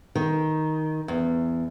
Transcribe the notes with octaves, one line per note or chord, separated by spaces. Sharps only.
D#3
E2